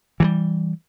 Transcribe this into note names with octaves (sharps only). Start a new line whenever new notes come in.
E3 F3 G3